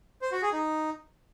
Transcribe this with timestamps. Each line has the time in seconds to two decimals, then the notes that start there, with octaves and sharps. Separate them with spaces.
0.22 C5
0.32 F#4
0.42 G#4
0.53 D#4